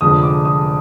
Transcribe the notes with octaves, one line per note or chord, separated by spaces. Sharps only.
F1 F2 D3 G#3 D#6
D6
D#6